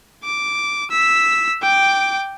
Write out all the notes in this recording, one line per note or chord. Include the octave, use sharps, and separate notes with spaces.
D6
E6 B6
G5 D6